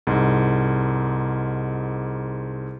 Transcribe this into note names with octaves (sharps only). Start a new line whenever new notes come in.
C2 G#2